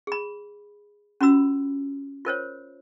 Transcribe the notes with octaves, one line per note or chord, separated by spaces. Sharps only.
G#4 B5
C#4 F4 F#4 B5 E6
F4 A#4 C5 C#5